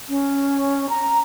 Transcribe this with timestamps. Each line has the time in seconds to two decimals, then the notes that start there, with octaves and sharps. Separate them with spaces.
0.09 C#4
0.89 A#5